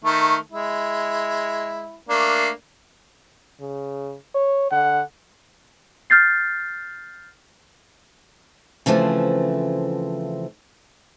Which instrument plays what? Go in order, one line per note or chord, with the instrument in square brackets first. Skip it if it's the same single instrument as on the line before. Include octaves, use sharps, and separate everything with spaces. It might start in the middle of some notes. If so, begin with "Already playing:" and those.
[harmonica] D#3 A3
G#3 E4
A3 A#3 D4
[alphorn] C#3
C#5
[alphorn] D3 [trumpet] F#5
[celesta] F6 G6 A6 C7
[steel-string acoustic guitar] C#3 E3 F3 A3 C4